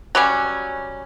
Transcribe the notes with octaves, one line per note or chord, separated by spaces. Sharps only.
F#3 G3 C#4